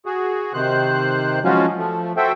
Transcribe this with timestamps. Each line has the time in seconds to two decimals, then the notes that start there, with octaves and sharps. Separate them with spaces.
0.06 F#4 G#4
0.54 C3 D#3 C5 F#6
1.44 F3 F#3 G#3 C#4 F4 F#4
1.78 F3 A3
2.17 F#4 A4 C5 E5 G5